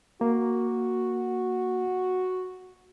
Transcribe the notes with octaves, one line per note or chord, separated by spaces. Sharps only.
A#3 F#4